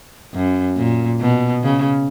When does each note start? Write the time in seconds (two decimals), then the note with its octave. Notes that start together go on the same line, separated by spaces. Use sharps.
0.34 F#2
0.76 A#2
1.20 B2
1.64 C#3